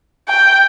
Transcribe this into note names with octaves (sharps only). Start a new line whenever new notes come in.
G5